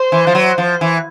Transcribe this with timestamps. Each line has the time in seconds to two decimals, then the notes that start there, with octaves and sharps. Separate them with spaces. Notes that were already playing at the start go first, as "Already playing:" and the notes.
Already playing: C5
0.12 E3
0.27 F3
0.35 F#3
0.58 F3
0.81 E3